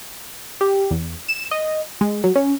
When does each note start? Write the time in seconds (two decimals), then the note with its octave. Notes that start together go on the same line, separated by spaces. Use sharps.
0.61 G4
0.91 E2
1.28 E7
1.51 D#5
2.01 G#3
2.24 F#3
2.35 C#4